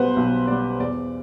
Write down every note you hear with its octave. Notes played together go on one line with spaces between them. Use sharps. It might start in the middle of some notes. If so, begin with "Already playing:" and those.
Already playing: B1 B2 G3 B3 B4 C5
B1
B2 G3 B3 D5
E2 D5